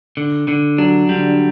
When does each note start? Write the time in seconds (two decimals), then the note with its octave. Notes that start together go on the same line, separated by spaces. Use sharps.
0.17 D3
0.48 D3
0.78 F#3 D4
1.09 D3 G3